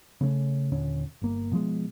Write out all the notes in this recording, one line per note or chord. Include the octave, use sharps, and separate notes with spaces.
C#3 A3 A#3 C#4
D#2 A#2 D3 C#4
G1 A#3
B2 F3 G3 G#3